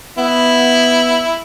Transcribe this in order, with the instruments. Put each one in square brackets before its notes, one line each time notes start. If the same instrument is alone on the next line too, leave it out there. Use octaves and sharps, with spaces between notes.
[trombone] B3 [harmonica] E4